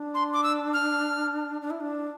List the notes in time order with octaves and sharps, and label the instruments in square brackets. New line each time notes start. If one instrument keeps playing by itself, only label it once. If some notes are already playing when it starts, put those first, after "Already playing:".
Already playing: [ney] D4
[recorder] C6
D6
E6
F6
[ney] D4
E4
D4